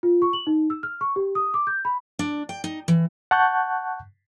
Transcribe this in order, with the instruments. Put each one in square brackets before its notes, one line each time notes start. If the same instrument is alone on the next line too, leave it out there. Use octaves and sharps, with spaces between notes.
[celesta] F4
C#6
F#7
D#4
E6
F6
C#6
G4
D#6
D6
G6
B5
[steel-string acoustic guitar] D4
G5
D#4
E3
[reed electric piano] F#5 A5 C#6 F#6 G6